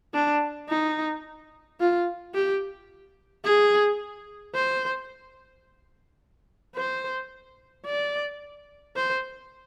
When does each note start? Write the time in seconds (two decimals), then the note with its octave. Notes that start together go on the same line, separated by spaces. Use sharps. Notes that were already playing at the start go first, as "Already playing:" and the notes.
0.14 D4
0.69 D#4
1.80 F4
2.34 G4
3.45 G#4
4.55 C5
6.76 C5
7.86 D5
8.96 C5